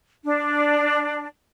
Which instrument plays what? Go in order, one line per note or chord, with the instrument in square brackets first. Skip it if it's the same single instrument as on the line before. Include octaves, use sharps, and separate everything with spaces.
[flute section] D4